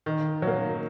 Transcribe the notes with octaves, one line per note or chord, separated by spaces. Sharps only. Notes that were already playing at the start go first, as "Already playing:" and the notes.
D#3
F#3
A#3